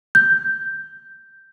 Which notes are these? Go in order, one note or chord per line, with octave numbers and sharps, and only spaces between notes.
G6